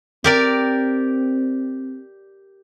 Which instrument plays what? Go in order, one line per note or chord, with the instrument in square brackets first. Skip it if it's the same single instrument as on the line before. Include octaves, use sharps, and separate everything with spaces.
[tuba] C4 [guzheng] G4 A#4 D5